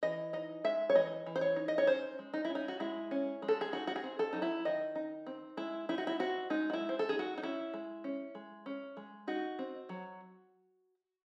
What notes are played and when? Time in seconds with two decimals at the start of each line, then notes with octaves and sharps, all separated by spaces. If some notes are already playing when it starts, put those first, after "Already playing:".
0.03 E3 D#5
0.33 D#4 D#5
0.64 G#3 E5
0.90 C#5
0.95 E3 D#5
1.26 E3
1.36 C5
1.41 C#5
1.56 D#4
1.68 D#5
1.78 C#5
1.87 C#4 C5
2.19 G#3
2.34 D#4
2.45 E4
2.50 C#4
2.55 D#4
2.68 F#4
2.80 G#3 E4
3.11 C#4
3.42 G#3
3.48 A4
3.61 G#4
3.72 D#4 F#4
3.87 F#4
3.96 G#4
4.04 C4
4.19 A4
4.33 F#3 D#4
4.42 E4
4.65 D#3 D#5
4.95 D#4
5.27 C4
5.57 G#3 E4
5.89 D#4 E4
5.98 F#4
6.07 E4
6.19 C4 F#4
6.50 G#3 D#4
6.70 F#4
6.73 E4
6.81 G#3
6.89 C5
6.99 A4
7.09 D#4 G#4
7.19 F#4
7.38 D#4
7.43 C#4 E4
7.74 G#3
8.04 C#4
8.35 G#3
8.66 C#4
8.97 G#3
9.27 D#4 F#4
9.59 C4
9.89 F#3